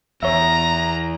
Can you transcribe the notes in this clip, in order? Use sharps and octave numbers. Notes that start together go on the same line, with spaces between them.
E2 C#5 E5 A#5